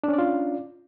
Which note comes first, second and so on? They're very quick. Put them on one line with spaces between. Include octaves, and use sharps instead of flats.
D4 C#4 D5 F4